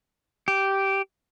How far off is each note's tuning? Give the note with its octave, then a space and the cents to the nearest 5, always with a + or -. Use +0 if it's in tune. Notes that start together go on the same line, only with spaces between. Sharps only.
G4 -10